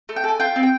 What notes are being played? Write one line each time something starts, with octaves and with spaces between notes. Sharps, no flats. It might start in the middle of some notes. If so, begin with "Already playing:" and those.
A3
G5
A4 G#5
F4 G5
C4
G5